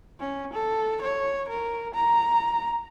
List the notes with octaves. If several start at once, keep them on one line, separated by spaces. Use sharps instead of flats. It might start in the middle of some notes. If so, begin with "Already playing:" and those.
C#4
A4
C#5
A#4
A#5